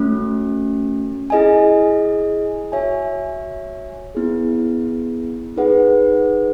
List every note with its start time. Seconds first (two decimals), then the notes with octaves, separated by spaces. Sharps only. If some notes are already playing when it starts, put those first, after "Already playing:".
Already playing: A3 C#4 F#4
1.30 E4 G#4 D#5 G#5
2.72 F#4 C#5 E5 G#5
4.15 B3 E4 G#4
5.56 D#4 G#4 B4 F#5